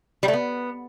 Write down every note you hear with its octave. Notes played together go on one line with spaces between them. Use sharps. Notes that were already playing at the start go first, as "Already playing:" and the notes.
G3
A3
B3